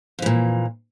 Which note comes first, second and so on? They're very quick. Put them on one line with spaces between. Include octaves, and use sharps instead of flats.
F2 E3 A#2